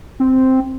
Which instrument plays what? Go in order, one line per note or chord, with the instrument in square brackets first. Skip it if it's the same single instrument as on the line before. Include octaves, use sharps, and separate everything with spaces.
[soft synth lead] C4